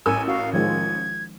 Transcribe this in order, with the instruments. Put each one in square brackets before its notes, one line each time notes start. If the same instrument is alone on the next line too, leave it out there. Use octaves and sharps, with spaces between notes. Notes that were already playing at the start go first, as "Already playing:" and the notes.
[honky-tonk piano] A1 A#4 E6 [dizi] G#5
[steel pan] F#4 [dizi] F5
[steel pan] D#3 F3 G#3 [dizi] G#6